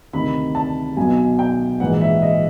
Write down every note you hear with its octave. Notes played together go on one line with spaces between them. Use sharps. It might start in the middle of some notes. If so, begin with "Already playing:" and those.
D2 C3 D#3 B5
A5
B1 B2 G#5
G5
A#1 G#2 E3 F#5
E5
D#5